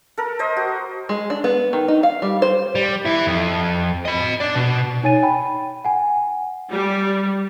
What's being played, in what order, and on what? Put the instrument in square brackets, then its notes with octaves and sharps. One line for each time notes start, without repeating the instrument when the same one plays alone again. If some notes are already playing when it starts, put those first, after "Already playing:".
[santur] A4 A#4
C5 D#5
F#4
[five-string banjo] G#3
D4
B3
D#3
D#4
F5
G3
C5
[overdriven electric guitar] G3
E3 E4
F2
D#5 B5
D4 D5
B2
[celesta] D#4 C#5 G#5 A6 D#7
G5 B5
F#5 G#5
[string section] G3